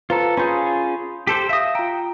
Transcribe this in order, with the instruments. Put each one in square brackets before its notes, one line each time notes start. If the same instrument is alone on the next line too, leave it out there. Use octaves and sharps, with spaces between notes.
[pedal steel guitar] F4 A4 [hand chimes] B4 C5 A#5
[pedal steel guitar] C#4 F4 G#4 [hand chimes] B5 C6 G6
[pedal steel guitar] G4 A4 C5
[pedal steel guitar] E5 D#6 [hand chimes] F5 E6 A#6
[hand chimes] F4 A#5 [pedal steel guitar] G5